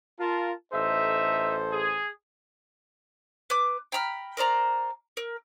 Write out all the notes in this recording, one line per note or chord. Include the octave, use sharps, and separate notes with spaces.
F4 A#4 A5
A1 D#4 A4 C5 E5
G#4
B4 D6
G5 A#5 B5 F6
A#4 C5 D5 A#5
A#4